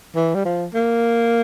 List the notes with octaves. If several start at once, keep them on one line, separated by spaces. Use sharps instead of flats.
E3
G3
F3
A#3